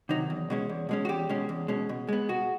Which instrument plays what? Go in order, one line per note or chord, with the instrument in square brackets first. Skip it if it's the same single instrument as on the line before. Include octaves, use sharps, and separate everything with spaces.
[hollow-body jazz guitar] C3 D#3 F#3 D#4
E2
B2 G#3 C#4
E2
B2 G#3 C#4
F#4
E2 G4
B2 G#3 C#4
E2
B2 G#3 C#4
B2
G#3 B3
B2 F#4